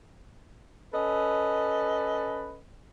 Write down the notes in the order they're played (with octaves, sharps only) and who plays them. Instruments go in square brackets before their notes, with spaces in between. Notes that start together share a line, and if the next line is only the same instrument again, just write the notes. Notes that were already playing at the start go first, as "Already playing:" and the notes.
[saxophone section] C#4 A4 B4 D#5